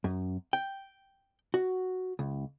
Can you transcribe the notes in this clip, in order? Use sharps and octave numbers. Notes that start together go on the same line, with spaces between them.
F#2
G5
F#4
C#2